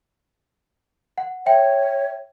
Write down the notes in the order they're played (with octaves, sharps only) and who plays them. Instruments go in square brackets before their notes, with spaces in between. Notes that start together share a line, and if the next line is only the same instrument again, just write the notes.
[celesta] F#5
[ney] C#5 [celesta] E5 G5